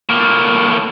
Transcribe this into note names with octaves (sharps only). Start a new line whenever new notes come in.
A2 A#3